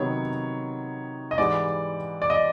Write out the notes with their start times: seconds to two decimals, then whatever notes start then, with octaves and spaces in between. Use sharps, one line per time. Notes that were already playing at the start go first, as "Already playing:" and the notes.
Already playing: C3 D#3 F#3 B3 C#5
1.31 D#5
1.38 G#2 E3 G3 D5
2.22 D5
2.30 D#5